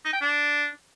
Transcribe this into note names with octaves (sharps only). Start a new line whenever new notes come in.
D#4
G5
D4